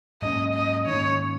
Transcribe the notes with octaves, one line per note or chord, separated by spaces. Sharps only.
G#2 F#3 A#3 C#4 D#5
D#5
G#2 D#3 A#3 C#4 C#5